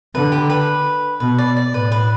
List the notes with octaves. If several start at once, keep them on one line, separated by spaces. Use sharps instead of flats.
D3 B4
G4
B4
B2 B4
D5
D5
A2 B4
B4